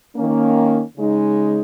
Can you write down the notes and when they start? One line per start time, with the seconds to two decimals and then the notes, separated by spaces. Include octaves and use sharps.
0.16 D#3 A#3 C#4
0.97 C#3 G#3 D#4